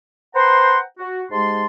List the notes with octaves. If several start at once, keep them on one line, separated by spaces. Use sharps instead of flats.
B4 C5 F#5 G5 A#5 C6
F#4
G#2 G#3 G4 A5 C6